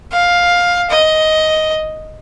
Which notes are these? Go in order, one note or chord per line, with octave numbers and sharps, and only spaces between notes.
F5
D#5